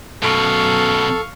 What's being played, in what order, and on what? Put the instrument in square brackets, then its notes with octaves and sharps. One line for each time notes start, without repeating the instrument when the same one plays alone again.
[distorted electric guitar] F#2 B2 [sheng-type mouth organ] A4 [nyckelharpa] F5 C#6